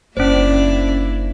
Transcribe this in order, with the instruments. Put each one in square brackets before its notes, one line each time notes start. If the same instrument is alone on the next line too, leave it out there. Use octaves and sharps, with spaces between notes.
[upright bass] F#1 [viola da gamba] A#3 E4 [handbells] C#4 C5 [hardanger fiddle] D4 D5